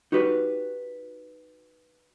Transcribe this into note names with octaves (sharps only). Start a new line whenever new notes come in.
D#4 F#4 G4 B4